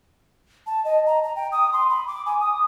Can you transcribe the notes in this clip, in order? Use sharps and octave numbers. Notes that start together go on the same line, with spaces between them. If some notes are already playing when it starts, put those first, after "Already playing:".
A5
D#5
A#5
A#5
G5
D#6
C6
B5
D6
G#5
D#6